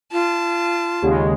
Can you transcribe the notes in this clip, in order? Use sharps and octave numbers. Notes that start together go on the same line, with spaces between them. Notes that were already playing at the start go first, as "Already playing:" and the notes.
F4 A5
D#2 C#3 G#3 G4 D5 F#5